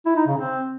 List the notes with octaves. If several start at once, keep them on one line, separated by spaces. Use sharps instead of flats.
E4
D#4
C#3
C4